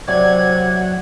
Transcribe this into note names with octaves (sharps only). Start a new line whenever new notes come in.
C3 F#3 D5 F#5 G#6